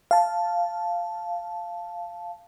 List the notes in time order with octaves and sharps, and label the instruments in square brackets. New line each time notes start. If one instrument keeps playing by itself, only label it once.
[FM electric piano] F5 A5